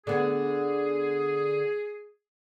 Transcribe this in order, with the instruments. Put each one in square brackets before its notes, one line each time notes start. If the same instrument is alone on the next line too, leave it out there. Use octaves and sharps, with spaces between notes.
[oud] D3 B3 [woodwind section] G#4